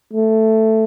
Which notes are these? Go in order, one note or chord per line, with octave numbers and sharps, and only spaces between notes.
A3